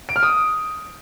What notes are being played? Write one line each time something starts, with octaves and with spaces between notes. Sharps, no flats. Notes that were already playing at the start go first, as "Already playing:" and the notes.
D7
F6
D#6